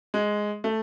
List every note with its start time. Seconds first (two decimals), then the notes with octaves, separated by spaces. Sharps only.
0.14 G#3
0.64 A3